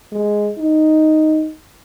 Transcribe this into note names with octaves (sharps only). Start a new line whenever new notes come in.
G#3
D#4